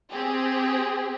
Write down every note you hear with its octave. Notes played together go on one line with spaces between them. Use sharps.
C4 G4 G#4